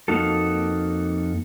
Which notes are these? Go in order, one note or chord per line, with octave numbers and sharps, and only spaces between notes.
F2 A#3 D#4 F#4 A4